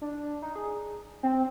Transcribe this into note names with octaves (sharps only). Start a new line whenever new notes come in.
D4
D#4
G#4
C4